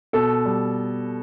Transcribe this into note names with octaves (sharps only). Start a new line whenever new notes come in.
B2 A4
G3